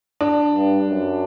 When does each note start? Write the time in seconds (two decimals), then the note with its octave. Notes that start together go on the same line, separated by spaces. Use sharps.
0.21 D4
0.54 G2
0.90 F#2